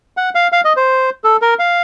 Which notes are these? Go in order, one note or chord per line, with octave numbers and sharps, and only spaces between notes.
F#5
F5
F5
D#5
C5
A4
A#4
F5